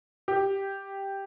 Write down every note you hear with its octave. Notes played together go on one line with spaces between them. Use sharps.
G4